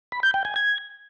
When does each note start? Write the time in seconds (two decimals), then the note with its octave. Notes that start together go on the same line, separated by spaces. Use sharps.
0.12 B5
0.23 G6
0.34 G5
0.45 G#5
0.56 G#6